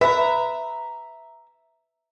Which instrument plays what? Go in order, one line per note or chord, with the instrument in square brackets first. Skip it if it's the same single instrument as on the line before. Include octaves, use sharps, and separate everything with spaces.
[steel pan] B4 [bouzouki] E5 A#5